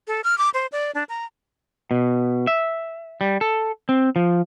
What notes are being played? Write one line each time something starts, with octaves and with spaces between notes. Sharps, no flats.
A4
F6
D6
C5
D5
D4
A#5
B2
E5
G3
A4
C4
F3